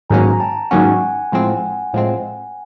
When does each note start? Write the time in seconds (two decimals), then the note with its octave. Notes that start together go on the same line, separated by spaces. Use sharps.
0.10 G#2 D#3 F#3 A#3 C#4 G#5 A#5
0.30 A#5
0.40 G5 A5
0.71 G#2 D#3 F#3 A#3 C#4 F#5 G#5
1.32 A2 F3 G#3 C4
1.93 A2 F3 G#3 C4